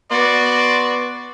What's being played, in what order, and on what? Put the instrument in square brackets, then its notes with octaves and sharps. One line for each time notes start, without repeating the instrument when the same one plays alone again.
[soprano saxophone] B3 [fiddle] F#4 [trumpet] D5 [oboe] C6